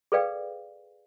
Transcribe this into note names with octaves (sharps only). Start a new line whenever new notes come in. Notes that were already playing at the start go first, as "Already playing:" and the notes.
G#4 A4 B4 D5 F5 G5